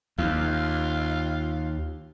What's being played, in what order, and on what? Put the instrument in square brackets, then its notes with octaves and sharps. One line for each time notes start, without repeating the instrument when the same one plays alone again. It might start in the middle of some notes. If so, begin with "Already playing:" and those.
[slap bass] D#2 [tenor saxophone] F4